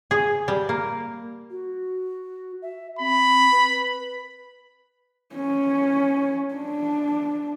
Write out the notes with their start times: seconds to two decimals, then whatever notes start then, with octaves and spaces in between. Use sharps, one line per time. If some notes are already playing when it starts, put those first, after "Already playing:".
0.11 G#4
0.48 G3
0.69 A#3
1.50 F#4
2.62 E5
2.99 C4 B5
3.51 B4
5.36 C#4
6.55 D4